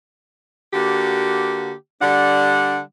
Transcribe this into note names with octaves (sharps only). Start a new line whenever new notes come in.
D3 A#3 F#4 G4
D3 G3 D4 F#5